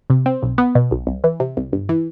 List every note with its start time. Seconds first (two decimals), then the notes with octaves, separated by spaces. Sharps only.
0.10 C3
0.26 C4
0.42 B1
0.58 B3
0.75 B2
0.91 B1
1.07 C2
1.24 E3
1.40 C3
1.57 C2
1.73 G1
1.89 E3